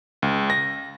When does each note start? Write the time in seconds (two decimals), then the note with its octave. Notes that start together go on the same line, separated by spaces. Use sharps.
0.22 C#2
0.50 A#6